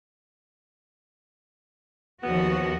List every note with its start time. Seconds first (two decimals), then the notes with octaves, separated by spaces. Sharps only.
2.23 D#2 F3 B3 F#4